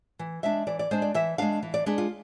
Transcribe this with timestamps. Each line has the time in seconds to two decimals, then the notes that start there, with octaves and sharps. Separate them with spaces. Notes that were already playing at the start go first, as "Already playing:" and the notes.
0.19 E3
0.43 G#3 D4 E5
0.67 E3 D5
0.79 D5
0.91 G#3 D4 C5
1.02 D5
1.14 E3 E5
1.38 G#3 D4 F5
1.63 E3
1.74 D5
1.86 G#3 D4 B4
1.98 F4